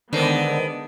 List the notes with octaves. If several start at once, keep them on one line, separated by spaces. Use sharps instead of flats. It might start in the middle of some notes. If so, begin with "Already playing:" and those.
D3 D#3 G#3 B3 D4 A#4 C5 D#5